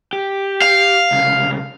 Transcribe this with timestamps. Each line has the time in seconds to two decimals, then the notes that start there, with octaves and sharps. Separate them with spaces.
0.13 G4
0.62 F5
1.12 C2 C#3